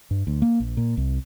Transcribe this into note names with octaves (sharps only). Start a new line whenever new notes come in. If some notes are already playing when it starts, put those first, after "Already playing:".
G2
D2
A#3
A#1
A#2
C2